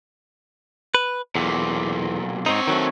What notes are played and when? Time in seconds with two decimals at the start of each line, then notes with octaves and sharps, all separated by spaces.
0.95 B4
1.35 B1 E2 A#2
2.46 G#2 C4 D#4 C#5
2.68 D#3 F#3 A3